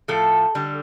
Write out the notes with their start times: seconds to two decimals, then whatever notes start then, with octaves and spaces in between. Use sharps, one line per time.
0.08 A2 F3 A3 A4
0.55 D3 G3